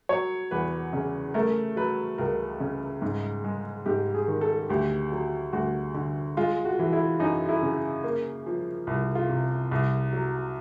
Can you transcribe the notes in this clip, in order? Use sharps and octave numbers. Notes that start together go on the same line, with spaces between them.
F#3 C#5
E2 B4
C#3
A3 A#4
F#3 B4
C#2 A#4
C#3
G#2
G#3
G#2 G4
G#4
D#3
A4
D2 G4
F#3
D2 F#4
D3
G#3 F4
F#4
E3
E4
F#2 D#4
E4
C#3
A#3
F3
C2
F4
C3
C2
F#3